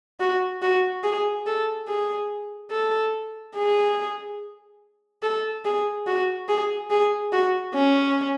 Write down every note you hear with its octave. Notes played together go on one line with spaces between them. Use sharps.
F#4
F#4
G#4
A4
G#4
A4
G#4
A4
G#4
F#4
G#4
G#4
F#4
C#4